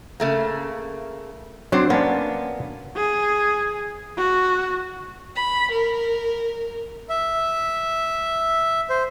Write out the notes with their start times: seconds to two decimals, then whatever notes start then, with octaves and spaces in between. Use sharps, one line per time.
0.20 C#3 A3 A#3
1.72 F#3 C4 D4 C5
1.90 A#3 B3 C#4 D4
2.96 G#4
4.17 F#4
5.35 B5
5.71 A#4
7.09 E5
8.90 C5